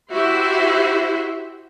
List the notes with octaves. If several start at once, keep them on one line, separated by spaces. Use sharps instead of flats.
E4 F#4 G4 C5 E5